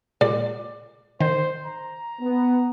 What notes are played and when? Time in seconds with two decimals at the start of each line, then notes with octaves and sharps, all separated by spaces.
0.21 A#2 G#3 D5
1.20 D#3 C5
1.65 A#5
2.21 B3